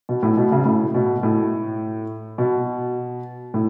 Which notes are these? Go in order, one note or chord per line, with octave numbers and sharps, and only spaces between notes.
B2
A2
B2
C#3
A2
B2
A2
B2
A2